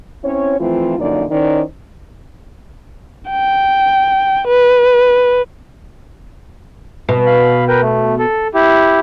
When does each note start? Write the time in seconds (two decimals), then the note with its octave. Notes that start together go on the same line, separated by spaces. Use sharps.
0.24 C4 C#4 E4 C#5
0.60 E3 F3 A3 C4 F4
0.99 F#2 D3 F3 A#3 D#4 D5
1.31 D#3 C#4 D#4 E4 C5 D5
3.30 G5
4.48 B4
7.09 B2
7.26 F5 B5
7.68 A#4 B4 G5
7.82 A3
8.19 A4
8.54 E4 G4